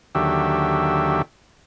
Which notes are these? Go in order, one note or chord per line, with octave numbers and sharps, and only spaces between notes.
D#2 D3 F#3 G4 E5